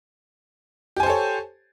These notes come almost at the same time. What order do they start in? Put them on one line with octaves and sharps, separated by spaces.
G4 G#5 C5 A4 C#5